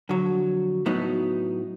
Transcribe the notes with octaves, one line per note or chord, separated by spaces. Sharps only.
F2 D3 F#3
A2 F#3 B3 D#4